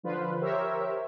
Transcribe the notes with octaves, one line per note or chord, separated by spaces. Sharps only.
D3 F3 F4 B4 C5
G4 A#4 C5 C#5 E5